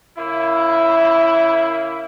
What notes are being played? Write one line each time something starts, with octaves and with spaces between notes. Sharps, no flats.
C#3 A#3 E4